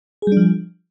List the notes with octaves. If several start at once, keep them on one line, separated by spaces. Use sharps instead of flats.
F3 G3 D4 G#4